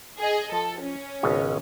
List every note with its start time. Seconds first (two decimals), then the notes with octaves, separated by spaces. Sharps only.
0.19 G#4 D#5
0.52 F3 A4
0.81 C#4
1.23 G#1 C#2 B2